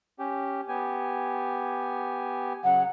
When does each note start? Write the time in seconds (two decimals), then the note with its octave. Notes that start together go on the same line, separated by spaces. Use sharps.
0.19 C#4 G4
0.68 B3 G4 G#5
2.64 C#3 F#3 F#5